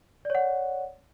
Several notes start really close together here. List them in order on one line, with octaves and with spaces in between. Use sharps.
D5 C#5 F#5